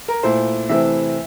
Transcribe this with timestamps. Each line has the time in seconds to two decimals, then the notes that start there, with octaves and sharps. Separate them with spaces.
0.08 A#4
0.23 A#2 A3 E4 C5
0.69 C3 E3 A3 C4 E4 E5